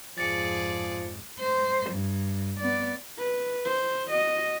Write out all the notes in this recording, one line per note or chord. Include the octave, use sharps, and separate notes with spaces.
F2 G#2 F3 G#4 D5 A6 C#7
C5
G2
B3 D5
B4
C5
F#4 D#5